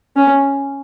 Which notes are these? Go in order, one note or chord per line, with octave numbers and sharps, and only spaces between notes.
C#4